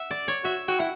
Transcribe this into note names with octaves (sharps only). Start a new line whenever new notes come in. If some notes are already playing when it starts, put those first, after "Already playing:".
Already playing: E5 F#5
D5
C#5
F#4 E5
F#4 G5
E4 F#5